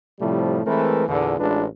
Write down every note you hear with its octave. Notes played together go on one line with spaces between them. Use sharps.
A2 C3 F3 G3 A3 E4
E3 G#3 A3 C4 A#4 B4
E2 A#2 D3
A1 G#3 D4 F4 B4